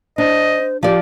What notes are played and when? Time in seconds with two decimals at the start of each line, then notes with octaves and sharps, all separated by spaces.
0.18 D4 C5 D#5
0.83 F3 G4 D5